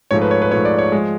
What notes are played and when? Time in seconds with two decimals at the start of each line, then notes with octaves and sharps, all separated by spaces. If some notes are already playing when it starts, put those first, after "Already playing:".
0.11 G#2 F3 A3 C#5
0.21 B4
0.31 C#5
0.42 B4
0.51 G#2 F3 A3 C#5
0.65 D5
0.79 C#5
0.92 F3 G#3